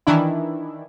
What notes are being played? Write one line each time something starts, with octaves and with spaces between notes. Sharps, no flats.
D#3 E3 D4 E4